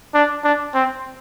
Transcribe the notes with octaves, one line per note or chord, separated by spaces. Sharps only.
D4
D4
C4